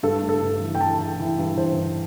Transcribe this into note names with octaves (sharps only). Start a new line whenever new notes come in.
G2 A4
A3
A4
G2
E3
G5
E3 A5
E3
E3
G2
E3 C5
G2